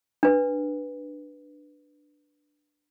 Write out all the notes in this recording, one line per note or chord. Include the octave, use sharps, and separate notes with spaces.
D4 B4